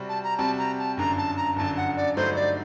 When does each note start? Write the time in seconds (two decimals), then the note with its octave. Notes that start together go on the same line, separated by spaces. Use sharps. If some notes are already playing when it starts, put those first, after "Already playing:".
Already playing: C3 G3 C4 F#4
0.09 A5
0.24 A#5
0.38 C3 G3 C4 F#4 A5
0.58 A#5
0.79 A5
0.97 G1 F#2 D3 A#5
1.17 A5
1.37 A#5
1.56 G1 F#2 D3 A5
1.77 F#5
1.96 D5
2.16 G2 D3 F#3 A3 D#4 C5
2.36 D5